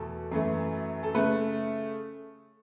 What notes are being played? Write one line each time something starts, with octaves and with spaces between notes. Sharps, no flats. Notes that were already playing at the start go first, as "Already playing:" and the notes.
Already playing: E2 B2 A3 A4
F#2 E3 A3
A4
C#3 A3 B4